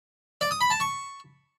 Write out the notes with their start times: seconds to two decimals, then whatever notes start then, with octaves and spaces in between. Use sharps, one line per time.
0.41 D5
0.51 D#6
0.61 B5
0.70 A5
0.80 C#6